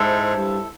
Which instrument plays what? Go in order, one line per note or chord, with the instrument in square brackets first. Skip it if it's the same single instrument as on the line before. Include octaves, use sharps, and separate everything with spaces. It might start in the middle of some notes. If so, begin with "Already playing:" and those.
Already playing: [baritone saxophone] G#2 [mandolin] E4 A4 C5
[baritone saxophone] G2